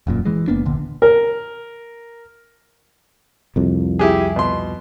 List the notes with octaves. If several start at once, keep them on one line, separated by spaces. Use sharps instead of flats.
E1 F#2 A#2
E3 G#3
F#1 A#3 B3 D4
D#1 A#1 D3
A#4
C2 F2
E4 G4 G#4
B2 C6